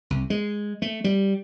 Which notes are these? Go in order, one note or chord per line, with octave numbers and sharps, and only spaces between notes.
C2
G#3
A3
G3